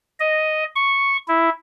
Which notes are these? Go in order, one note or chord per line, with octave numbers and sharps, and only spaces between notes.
D#5
C#6
E4